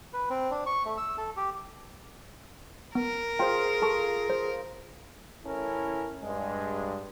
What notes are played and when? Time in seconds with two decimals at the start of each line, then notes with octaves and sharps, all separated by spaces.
0.13 B4
0.30 C4
0.51 D4
0.66 C#6
0.85 A3
0.97 E6
1.18 A4
1.37 G4
2.95 B3 A#4
3.39 F4 G#4 C5 G5
3.82 A4 A5 C#6
4.30 C5
5.45 A1 C#4 E4 A4 A#4
6.23 G2 G#3